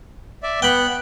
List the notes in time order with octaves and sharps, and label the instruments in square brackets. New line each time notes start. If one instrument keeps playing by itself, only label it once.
[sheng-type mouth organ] D5 E5
[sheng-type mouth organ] B3 F#6 [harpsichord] G5 B5